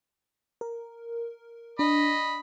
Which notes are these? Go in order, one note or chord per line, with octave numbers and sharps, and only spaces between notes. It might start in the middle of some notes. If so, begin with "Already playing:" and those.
A#4
D4 D#5 B5